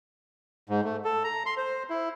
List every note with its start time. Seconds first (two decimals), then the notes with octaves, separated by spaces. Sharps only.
0.69 G#2
0.84 A3
1.05 A4
1.24 A#5
1.46 C6
1.57 C5
1.90 E4